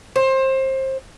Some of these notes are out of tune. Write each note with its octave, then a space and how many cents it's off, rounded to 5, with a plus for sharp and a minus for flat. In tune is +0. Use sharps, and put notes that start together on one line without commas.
C5 +25